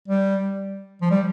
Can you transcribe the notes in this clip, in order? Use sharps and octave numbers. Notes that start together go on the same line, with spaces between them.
G3
F3
G3